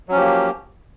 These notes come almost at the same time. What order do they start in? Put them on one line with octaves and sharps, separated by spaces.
F#3 C#4 F3 G4 A#3